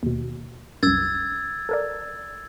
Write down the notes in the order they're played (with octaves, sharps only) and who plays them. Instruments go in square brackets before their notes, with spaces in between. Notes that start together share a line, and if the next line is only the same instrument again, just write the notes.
[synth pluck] D#2 B2
[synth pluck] C2 F#2 [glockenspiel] E6 G#6 A6
[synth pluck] A4 A#4 D5